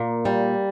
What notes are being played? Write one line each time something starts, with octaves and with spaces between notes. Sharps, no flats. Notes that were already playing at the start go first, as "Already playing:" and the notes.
Already playing: A#2 A#3
G3